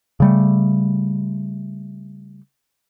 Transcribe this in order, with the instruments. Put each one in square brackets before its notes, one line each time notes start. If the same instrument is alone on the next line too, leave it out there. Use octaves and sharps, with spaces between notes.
[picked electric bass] C#3 G3 A3